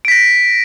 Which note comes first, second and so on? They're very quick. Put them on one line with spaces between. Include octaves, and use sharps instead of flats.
D7 B6 A#6